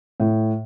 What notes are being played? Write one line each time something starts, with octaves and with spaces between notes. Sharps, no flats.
A2